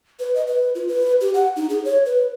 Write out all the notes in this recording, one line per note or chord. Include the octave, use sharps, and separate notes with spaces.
B4
D#5
B4
F4
B4
G4
F#5
D#4
G#4
C#5
B4